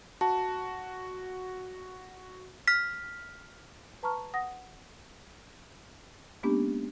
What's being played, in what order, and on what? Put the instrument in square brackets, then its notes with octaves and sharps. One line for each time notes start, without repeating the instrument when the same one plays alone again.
[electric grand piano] F#4 [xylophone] A5
[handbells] F6 B6
[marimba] B4 A5 A#5 C#6 F6
F#5 D#6 A#6
G#3 A#3 B3 C#4 D4 G4